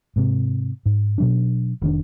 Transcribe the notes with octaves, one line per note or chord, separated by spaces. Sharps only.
G#2 C3
G#2
B2 F#3 D4
F1 D#3 D4